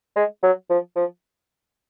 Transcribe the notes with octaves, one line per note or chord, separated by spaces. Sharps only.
G#3
F#3
F3
F3